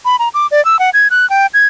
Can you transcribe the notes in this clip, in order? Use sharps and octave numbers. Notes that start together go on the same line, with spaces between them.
B5
A#5
D6
D5
E6
F#5
G#6
F#6
G5
G#6